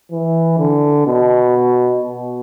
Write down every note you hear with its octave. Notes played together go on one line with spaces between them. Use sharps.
E3
D3
B2
B2